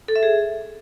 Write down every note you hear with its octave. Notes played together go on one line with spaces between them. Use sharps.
A4
E5
G#4